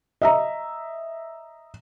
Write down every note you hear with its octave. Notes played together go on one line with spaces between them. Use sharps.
D#5 E5 A#5